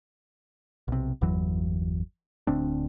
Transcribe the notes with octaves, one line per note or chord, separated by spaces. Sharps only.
B1 C3
G1 E2 E3 F#3
D1 D2 C4 D4